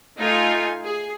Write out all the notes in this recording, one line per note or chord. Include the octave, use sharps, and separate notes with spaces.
A3 D#4 F4 G#5
G#4